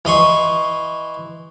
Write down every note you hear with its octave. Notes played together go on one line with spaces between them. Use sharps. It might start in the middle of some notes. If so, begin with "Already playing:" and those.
E3 D#5 C6 C#6